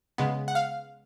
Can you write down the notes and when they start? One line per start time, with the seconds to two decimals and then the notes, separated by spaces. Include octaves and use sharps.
0.18 C#3 G#3 B3
0.48 F#5
0.55 F5